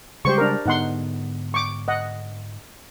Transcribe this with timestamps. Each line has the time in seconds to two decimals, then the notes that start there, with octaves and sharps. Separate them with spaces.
0.25 C#3 G3 G#3 G4 C5 C#6
0.38 D4 A#4
0.66 G#2 D3 B3 D#4 F#5 C6
1.54 C#6 D6
1.88 D#5 F#5